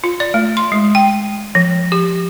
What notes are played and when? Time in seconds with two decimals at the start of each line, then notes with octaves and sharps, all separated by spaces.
0.04 F4
0.20 D5
0.34 A3
0.57 C6
0.72 G#3
0.95 G5
1.55 F3
1.92 G4